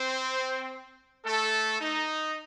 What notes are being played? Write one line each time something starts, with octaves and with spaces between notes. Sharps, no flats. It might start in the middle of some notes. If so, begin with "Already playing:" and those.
Already playing: C4 C5
A3 A4
D#4